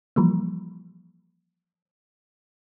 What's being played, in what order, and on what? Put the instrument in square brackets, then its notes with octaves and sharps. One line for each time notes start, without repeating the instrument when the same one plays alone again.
[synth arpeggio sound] E3 F3 G3 A#3